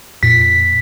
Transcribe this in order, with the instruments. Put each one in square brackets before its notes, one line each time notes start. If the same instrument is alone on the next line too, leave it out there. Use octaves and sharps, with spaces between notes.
[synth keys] F2 A#2 [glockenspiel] B6